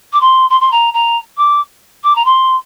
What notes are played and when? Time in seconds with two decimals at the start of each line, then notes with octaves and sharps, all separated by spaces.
0.13 D6
0.21 C6
0.50 C6
0.61 C6
0.72 A#5
0.94 A#5
1.37 D6
2.04 D6
2.16 A#5
2.25 C6